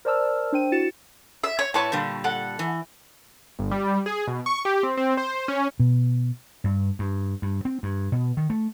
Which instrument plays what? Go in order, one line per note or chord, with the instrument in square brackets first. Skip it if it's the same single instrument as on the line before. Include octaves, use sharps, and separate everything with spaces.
[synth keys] A#4 C5 D5 A5 E6 F6
D4 C5 G5 D#7
E4 F#4 A6 C#7 E7
[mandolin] E5
C#5
[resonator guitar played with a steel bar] A2 B4 C#5 [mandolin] A5 C#6
[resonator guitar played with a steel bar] A#2 D3 G3
[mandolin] A4 F#5
[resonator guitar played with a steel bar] E3
[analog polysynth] G1
G3
G#4
B2
C#6
G4
C4
C4
C5
C#4
[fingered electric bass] B2
[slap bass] G2
G2
G2
C4
G2
B2
D#3
A3